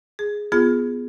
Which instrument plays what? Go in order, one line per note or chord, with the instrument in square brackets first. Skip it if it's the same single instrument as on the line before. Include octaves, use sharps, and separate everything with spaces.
[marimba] G#4
B3 F4 G#4